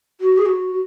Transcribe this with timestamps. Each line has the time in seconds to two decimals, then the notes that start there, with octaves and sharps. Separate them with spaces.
0.21 F#4
0.38 G#4
0.46 F#4
0.71 F#4